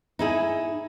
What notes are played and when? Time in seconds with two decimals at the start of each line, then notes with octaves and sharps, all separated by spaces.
0.19 D#4 E4 G#4